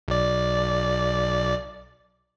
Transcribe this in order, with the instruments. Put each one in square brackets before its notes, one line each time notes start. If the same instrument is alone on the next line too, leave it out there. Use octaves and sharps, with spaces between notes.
[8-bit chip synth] B1 D5